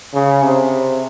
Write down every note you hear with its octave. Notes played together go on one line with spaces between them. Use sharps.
C#3
C3